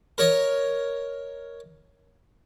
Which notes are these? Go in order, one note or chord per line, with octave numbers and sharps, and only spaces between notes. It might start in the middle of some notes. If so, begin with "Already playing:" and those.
A#4 C#5 D#5